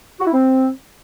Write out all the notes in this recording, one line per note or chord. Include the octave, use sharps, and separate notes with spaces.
F#4
E4
C4